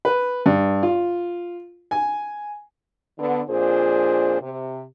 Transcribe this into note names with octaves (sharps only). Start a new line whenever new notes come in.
B4
G2
F4
G#5
D3 B3
F2 A#2 D4 F4 G#4 C5
C3